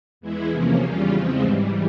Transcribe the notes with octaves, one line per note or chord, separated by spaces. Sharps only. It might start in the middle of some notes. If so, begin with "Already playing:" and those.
E2 E3 G#3 E4
E2 C3 F3 A#3 C#4
E2 C#3 G3 C#4 F4
E2 C#3 F3 G#3 C4
G#2 E3 G3